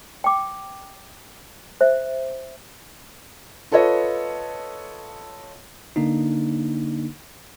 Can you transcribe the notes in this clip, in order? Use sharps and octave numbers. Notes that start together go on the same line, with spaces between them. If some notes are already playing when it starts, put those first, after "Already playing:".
G5 D6
C5 E5
F4 A4 B4 C#5 D#5
D3 A#3 D4 D#4